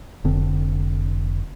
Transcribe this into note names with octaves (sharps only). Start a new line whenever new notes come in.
F1 D3 C4